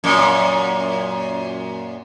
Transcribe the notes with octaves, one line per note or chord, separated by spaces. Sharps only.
F#2 A#2